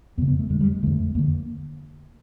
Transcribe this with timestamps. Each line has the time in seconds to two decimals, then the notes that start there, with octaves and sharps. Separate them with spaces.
0.18 F2 B3
0.22 C#3
0.28 B3
0.39 A3
0.50 F2 D3 G#3
0.61 G3
0.72 G#3
0.83 F2 D3 A3
1.15 F2 D3 A#3